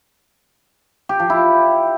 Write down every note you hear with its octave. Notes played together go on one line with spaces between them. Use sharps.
G4
F3
E4